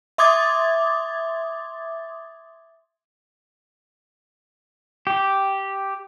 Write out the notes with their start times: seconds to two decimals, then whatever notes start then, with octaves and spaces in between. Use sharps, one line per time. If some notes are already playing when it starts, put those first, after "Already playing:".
0.18 E5 C6 D6 D#6 G#6 A6
5.07 G4